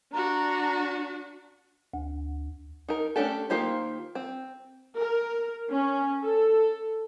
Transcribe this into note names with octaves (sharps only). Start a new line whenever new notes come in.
D4 F#4 A#5
D2
D#4 A#4
A3 C#4 D4 G4 A4
D#3 A#3 F4 G4 C5
C4
A#4
C#4
A4